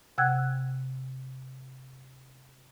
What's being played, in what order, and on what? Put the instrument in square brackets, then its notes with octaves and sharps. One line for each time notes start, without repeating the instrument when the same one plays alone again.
[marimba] C3 F#5 G5 E6 F#6 G#6